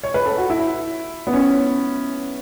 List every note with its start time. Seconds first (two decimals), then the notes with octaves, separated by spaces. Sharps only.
0.03 C#5
0.14 B4
0.26 A4
0.38 F#4
0.50 E4
1.27 B3
1.33 C#4